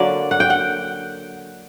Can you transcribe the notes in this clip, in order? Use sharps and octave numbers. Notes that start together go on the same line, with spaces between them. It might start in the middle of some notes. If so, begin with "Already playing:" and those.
Already playing: D3 F#3 A#3 D5
F#5
G5
F#5